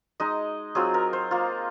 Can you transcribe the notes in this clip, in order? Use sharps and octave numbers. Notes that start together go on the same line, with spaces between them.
G#3 D#4 D#5
F#3 C4 F4 G#4
A#4
C5
A#3 F4